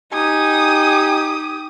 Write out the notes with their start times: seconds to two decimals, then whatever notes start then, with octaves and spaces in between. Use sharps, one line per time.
0.13 D#4 G4 G#5 D#6